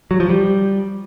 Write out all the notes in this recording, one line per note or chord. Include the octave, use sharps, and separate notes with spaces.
F#3
F3
G3